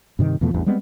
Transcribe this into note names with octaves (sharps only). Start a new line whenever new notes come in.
G2 C3 D#3
E2 B2 F3 A3
A1 E2 G2
G3 G#3 B3 C4